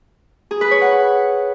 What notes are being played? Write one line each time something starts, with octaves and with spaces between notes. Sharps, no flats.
G#4
B4
C#5
F#5